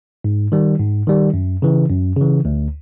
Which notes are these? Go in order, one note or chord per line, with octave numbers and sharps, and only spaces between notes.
G#2
D#3 G3
G#2
D#3 G3
F#2
C#3 E3
F#2
C#3 E3
D2